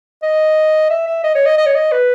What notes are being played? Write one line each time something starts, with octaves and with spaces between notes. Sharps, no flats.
D#5
E5
E5
D#5
C#5
D#5
D#5
C#5
D#5
B4